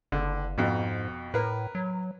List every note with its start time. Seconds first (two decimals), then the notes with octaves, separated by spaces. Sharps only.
0.12 F#1 D3
0.58 F2 G#2 B2
1.34 A2 A#4 B4
1.75 F#3